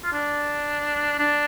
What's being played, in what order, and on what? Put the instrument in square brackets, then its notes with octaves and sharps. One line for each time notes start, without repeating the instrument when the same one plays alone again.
[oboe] F4
D4
D4